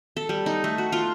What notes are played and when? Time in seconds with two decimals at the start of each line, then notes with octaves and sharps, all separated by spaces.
0.17 A4
0.29 G3
0.46 D#4
0.64 A3
0.78 F#4
0.92 F4